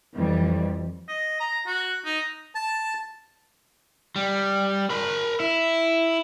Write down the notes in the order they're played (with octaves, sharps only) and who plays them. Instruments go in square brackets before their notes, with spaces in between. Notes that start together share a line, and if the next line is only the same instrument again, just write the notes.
[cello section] F2 E3 G3
[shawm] D#5
A#5
F#4
D#4
[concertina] A5
[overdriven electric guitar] G3
A#4 B5
E4